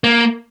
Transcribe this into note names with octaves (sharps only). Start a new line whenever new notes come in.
A#3